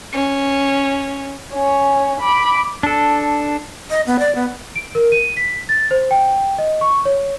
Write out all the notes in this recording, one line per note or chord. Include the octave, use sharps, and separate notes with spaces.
C#4
C#4 C#5
B5 D6
D4 A4
D#5
B3
D5
B3
D7
A#4
D#7
B6
A6
C5
G5
D#5
C#6
C#5